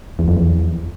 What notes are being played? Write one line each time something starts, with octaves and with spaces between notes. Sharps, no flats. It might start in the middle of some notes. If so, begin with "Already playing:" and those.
E2
F2
E2